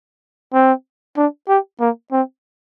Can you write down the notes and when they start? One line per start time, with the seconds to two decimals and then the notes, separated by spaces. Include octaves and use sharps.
0.53 C4
1.17 D4
1.48 G4
1.80 A#3
2.12 C4